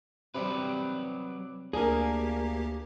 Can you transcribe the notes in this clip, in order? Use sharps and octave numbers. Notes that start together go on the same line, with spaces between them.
C3 F#3 G3 G4 B4
D2 A#3 D4 G4 G#4 A#4